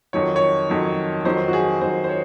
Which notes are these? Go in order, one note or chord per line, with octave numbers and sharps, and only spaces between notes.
F2 D#3 F#3 C#5
C#5
F2 D#3 F#3
F2 D#3 F#3 C5
F#4
G#4
F2 D#3 F#3 C5
C5
C#5